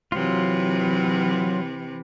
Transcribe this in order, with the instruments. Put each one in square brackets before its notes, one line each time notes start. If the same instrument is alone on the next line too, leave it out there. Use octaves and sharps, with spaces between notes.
[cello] C3 E3 [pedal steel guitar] F#3 F4